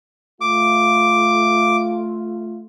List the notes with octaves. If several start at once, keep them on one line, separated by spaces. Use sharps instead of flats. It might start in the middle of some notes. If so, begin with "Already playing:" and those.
A3 F4 D6